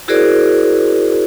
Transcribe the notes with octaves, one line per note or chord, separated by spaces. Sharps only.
E4 F#4 G#4 A#4 C5 D5